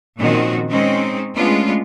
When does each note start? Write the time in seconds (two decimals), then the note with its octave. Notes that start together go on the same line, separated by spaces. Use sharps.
0.19 A#2 D#3 F3 C4 C#4 F#4
0.69 G#3 C4 C#4 D#4
1.36 G#3 A3 B3 C#4 D4 F4